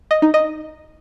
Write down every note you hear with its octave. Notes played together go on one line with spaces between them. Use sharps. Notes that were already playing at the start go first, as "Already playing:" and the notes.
D#5
D#4
D#5